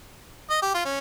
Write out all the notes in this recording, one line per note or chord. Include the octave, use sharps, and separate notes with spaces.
D#5
G4
F4
C#4